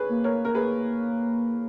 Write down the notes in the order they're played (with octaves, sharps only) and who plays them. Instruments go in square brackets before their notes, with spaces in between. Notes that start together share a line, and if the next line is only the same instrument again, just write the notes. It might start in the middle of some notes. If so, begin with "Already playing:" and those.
Already playing: [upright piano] G#4 B4 C#5
[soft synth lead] A#3
[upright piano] A#4 C#5
A#4
G#4 B4